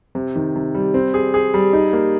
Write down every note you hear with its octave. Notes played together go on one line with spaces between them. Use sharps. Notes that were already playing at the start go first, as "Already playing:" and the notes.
C3
D#3
C3
G3
C4
G#4
G#4
G3
D#4
A#3